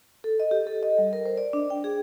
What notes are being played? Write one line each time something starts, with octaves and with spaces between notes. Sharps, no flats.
A4
D#5
G4
A4
D#5
G3
A#4
C5
D5
D4
G5
G#4